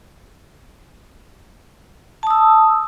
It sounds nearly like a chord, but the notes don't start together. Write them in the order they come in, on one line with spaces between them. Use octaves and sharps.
A5 D#6 E6